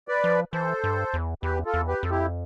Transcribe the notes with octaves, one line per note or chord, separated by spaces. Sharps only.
B4 D5
F3
E3 A4 C5
G2
E2
E2 G4 B4
F4 A4
E2
G4 B4
F2 A4
E4 G4